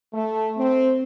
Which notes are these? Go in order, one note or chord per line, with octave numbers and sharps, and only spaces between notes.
A3
C4